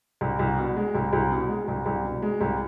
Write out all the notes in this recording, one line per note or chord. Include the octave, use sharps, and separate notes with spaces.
C2
C2
B2
G#3
C2
C2
B2
G#3
C2
C2
B2
G#3
C2